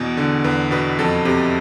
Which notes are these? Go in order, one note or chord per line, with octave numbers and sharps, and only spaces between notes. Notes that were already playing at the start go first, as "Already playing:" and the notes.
Already playing: E2 B2
D3
E2 B4
B2 B4
F2 A4
C3